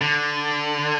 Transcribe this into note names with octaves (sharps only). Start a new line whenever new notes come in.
D3